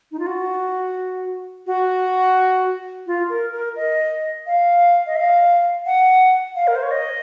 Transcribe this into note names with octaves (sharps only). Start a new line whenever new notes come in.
D#4
F4
F#4
F#4
F4
A#4
A#4
D#5
F5
D#5
F5
F#5
F5
A#4
C5
C#5
D#5